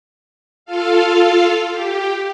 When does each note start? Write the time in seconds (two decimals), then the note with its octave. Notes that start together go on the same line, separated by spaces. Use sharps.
0.66 F4 A4 F5
1.72 G4